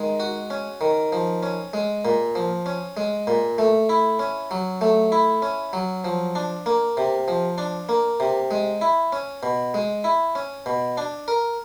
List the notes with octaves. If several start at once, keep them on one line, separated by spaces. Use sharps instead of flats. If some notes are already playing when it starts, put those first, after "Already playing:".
Already playing: D#3 G#3
F#4
C#4
D#3
F3
C#4
G#3
A#2
F3
C#4
G#3
A#2
A3
E4
C#4
F#3
A3
E4
C#4
F#3
F3
D4
A#3
C3
F3
D4
A#3
C3
G#3
E4
C#4
B2
G#3
E4
C#4
B2
D4
A#4